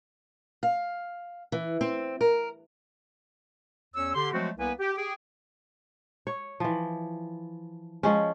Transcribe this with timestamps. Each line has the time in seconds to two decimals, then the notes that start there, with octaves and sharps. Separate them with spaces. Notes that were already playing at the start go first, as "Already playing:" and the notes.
0.63 F5
1.52 E3
1.81 C4
2.21 A#4
3.94 E2 C#4 C#5 E6
4.14 D3 G4 C6
4.32 F3 F#3 G#3 A3 C4 F#4
4.57 C2 A#3 B3 B4 G#5
4.79 G4
4.97 G4 G#4 G5
6.27 C#5
6.60 E3 F3
8.03 F3 G#3 C#4